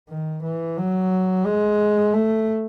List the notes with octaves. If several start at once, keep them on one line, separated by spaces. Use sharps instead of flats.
D#3
E3
F#3
G#3
A3